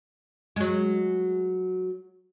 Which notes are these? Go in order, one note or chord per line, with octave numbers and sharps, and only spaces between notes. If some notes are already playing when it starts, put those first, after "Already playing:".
F#3 G#3